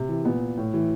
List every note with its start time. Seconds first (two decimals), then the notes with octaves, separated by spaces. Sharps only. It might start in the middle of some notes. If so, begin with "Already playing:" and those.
Already playing: C3
0.09 E3
0.25 A#2 B3
0.57 A2
0.73 E3